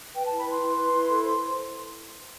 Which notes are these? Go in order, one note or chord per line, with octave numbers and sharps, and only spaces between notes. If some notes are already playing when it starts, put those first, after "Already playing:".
B4 G5
E4 A5
B5
B4 C6
E4
B4
E4
A4
C5